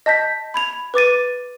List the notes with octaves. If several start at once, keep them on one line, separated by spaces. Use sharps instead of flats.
D#5 A5 G6 B6
B5 G#6 F7
B4 D6 A6 D#7